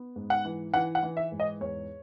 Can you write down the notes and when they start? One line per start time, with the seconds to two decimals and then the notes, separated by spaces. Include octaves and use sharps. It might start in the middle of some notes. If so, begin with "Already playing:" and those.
Already playing: B3
0.16 G#2
0.30 F#5
0.45 E3
0.74 E3 F#5
0.95 F#5
1.03 E3
1.17 E5
1.32 G#2
1.40 D#5
1.61 E2 C#5